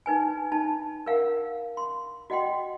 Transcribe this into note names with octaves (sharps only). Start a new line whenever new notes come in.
D#4 B4 G#5
D#4 A5
A#4 F5 F#5
C6
F#4 D#5 F#5 G5 C6